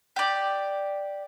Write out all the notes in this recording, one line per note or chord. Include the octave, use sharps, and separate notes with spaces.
G4 D5